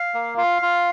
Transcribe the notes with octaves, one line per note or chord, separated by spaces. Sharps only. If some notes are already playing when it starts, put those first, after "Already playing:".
Already playing: F5
A#3
F4 F5
F4